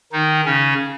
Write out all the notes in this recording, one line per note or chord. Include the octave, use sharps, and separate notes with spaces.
D#3 D#4
C#3 C#4